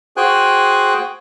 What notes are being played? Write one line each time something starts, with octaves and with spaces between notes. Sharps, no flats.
F#4 G#4 C5 G5 G#5 F#6